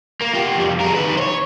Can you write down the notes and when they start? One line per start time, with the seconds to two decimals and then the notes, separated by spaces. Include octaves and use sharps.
0.22 A#3
0.34 F4 G4
0.58 F2 G3
0.81 G#4 A#4
0.95 D#3 B4
1.17 C5 C#5